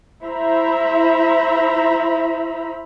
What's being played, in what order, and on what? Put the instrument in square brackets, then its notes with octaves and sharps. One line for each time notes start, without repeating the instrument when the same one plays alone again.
[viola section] E4 C5 E5 A#5 B5